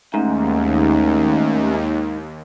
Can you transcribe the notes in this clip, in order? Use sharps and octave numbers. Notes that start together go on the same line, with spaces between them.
D#2 G#2 A3 C#4 D#4